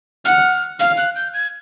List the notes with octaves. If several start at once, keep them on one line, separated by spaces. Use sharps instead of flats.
F#5 F6
F5 F6
F#6
G6
G#6